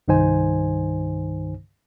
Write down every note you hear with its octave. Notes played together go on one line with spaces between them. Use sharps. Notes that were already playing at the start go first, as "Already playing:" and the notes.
C2 G2 D#3 D#4 C5 G#5